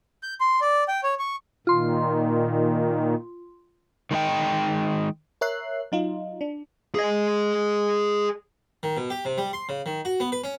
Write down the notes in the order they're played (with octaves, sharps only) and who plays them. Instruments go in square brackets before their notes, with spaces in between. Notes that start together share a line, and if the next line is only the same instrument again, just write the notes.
[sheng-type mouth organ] G6
C6
D5
G5
C#5
C#6
[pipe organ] A#2 D#3 [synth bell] F4 C6
[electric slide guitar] D#3 G#3 A#3 D#5 G5
[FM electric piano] A#4 C#5 E5 F#6 C7
F#3 D#4 F4
D4
[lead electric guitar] G#4 D#5
[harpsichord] D#3
B2
G4
C3
G3
C6
C#3
D#3
F#4
B3
B4
C#4